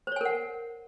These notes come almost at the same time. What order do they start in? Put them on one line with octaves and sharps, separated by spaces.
C5 C#5 G#5 A#4 F#5